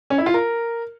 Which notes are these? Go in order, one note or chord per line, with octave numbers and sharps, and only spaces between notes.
C#4
E4
F4
A#4